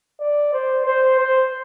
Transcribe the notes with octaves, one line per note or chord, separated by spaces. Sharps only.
D5
C5
C5
C5